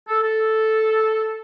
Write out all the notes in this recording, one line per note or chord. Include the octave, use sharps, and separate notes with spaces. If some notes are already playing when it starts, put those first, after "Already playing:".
A4
A4